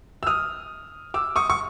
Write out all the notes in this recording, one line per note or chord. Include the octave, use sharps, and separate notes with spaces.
E6
D#6 F6
D6 E6
C#6 D#6
C#6